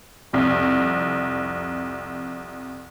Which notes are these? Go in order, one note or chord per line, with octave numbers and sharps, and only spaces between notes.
C2 F2